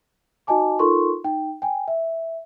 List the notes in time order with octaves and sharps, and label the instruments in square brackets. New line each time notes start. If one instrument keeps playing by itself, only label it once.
[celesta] D#4 F#4 D#5 G#5 A5 D6
D#4 F4 A4 A#4 C6 C#6
D#4 G5
G5 G#5
E5